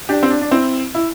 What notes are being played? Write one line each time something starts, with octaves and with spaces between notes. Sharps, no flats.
D4 G4
C4
D4
D4
C4 E4
E4